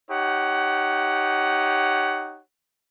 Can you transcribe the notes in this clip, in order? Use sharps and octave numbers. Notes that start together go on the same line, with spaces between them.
D#4 G4 C#5 F#5